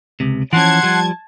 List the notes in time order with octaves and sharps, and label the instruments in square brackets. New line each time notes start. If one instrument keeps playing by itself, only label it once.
[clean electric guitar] C#2 C3
[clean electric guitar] E3 F3 C#4 [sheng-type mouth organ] F#5 C6 [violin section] A5 G#6
[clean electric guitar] F3 G3